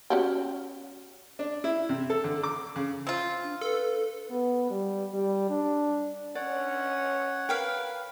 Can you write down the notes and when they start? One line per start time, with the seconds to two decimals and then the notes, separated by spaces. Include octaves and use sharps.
0.10 C#4 F#4 G4
1.39 D4
1.64 E4
1.89 C3
2.10 A4
2.24 D3
2.43 D6
2.76 C#3
3.07 C4 F4
3.43 D4
3.61 A4 B4
4.30 B3
4.70 G3
5.14 G3
5.49 D4
6.35 C#4 C#5 D5 F#5
7.49 A#4 B4 F5 G5